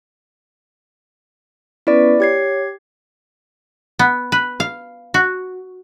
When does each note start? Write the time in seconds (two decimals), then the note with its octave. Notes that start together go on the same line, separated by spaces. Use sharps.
1.87 B3 C#4 E4 B4 D5
2.20 G4 C#5 G#6 C7
3.99 B3
4.32 B4
4.60 F5
5.14 F#4